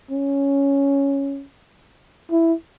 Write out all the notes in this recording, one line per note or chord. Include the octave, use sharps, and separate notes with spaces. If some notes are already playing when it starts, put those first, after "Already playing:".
C#4
E4